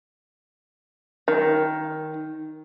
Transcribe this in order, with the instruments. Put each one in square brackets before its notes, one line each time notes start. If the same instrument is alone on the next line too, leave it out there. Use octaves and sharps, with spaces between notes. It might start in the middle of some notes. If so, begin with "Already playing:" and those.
[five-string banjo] D#3